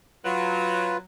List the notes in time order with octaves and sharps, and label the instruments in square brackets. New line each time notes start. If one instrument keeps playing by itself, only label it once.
[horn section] F#3 [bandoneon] F4 B4